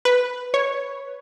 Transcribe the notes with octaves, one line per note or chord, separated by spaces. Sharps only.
B4
C#5